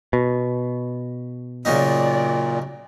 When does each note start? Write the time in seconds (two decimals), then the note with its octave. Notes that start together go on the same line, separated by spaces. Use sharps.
0.13 B2
1.65 A#2 C#3 F#3 D#4 D5